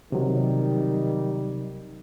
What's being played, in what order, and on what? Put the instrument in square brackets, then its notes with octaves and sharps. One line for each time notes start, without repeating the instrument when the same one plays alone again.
[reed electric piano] C3 F#3 [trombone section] D#3 G3 D#4